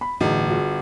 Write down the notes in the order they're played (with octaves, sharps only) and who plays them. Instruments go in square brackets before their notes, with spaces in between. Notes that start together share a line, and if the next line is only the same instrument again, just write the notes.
[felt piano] B5
[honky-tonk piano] G1 [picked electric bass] A2 E3 [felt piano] D#4 F#4 G#4
[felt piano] F4 F#4 G#4